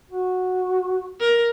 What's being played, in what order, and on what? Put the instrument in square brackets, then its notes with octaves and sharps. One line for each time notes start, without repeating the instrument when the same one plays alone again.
[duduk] F#4
[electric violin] A#4